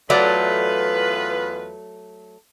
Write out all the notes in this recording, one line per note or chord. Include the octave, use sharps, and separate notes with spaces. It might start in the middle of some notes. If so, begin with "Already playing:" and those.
E2 F#3 A3 F4 B4 D5